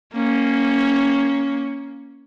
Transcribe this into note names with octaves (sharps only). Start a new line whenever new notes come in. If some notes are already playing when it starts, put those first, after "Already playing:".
A#3 C#4